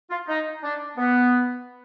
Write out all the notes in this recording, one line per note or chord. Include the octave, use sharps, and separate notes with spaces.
F4
D#4
D4
B3